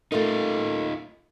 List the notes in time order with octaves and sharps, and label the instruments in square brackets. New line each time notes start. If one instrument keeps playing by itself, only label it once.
[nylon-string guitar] A3 A#4 [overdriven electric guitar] D#4 F4